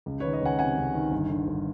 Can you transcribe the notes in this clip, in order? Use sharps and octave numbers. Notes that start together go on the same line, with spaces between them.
C#2
B4 C#5
D#3
C#5 D#5
C#2 F#5 G#5
C3 F#5 G#5
C#2
D#3
G1
D3
G1